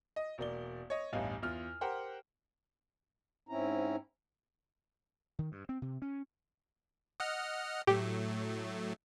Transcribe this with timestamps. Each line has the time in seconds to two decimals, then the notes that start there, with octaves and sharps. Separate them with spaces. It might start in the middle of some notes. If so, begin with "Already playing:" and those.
0.16 D#5
0.38 E1 A#3 D5 G7
0.90 C#5 D#5
1.13 A1 E2 G2 D#4 F5 G#5
1.42 E2 F4 F6
1.81 G4 A#4 C5 F#5 G5
3.49 G#2 C4 C#4 E4 A#5
5.39 D#3
5.52 G2
5.69 C4
5.82 C3
6.02 C#4
7.20 D#5 F#5 F6
7.87 A2 F#3 A3 G4